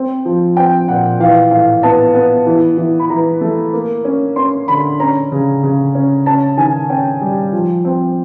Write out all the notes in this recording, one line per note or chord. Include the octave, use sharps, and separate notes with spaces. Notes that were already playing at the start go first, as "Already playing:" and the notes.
Already playing: C4
F3
C4 G5
A#2 F#5
E3 F5
A2 F5
B3 A5
B3
E3
E3
B5
E3 A#5
A3
A#3
C#4
C#4 C6
D3 B5
C#4 A#5
C#3
C#3
C#4
C#4 A5
D#3 G#5
C#4 G5
G3
F3
C4